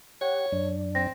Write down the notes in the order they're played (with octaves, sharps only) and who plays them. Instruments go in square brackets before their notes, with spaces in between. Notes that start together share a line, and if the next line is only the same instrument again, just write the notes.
[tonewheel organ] G4 F#5 [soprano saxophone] C#5
[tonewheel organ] F#2 D4
[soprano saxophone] C4 [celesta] A#6